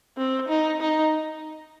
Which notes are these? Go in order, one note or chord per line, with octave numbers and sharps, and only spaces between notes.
C4
D#4
D#4